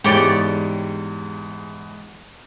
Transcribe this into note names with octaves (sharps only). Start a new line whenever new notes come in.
E2 G#2 G4 C#5 D5